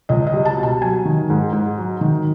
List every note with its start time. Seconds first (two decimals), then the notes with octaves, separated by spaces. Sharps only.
0.09 C#2 D#5
0.27 D#5
0.34 G3
0.45 A5
0.58 B2
0.63 A5
0.81 F#3 G#5
1.05 D#3
1.30 G#2
1.53 G#2
1.78 F#3
2.01 D#3